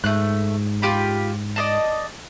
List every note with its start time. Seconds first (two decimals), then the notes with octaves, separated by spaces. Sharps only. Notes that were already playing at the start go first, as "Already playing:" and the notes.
0.04 G#2 A3 F#6
0.82 F4 G4 B5
1.56 D5 D#5 A5